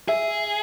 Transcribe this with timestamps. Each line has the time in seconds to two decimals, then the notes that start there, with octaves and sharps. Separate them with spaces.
0.08 G#4 E5